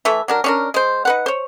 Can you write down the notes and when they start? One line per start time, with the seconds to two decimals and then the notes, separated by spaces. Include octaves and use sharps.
0.05 E3 A3 E5
0.28 F#3 D4 A#4
0.44 C#4 D4 A#4
0.74 G#3 C5
1.05 D#4 B4 F#5
1.26 C5 C#5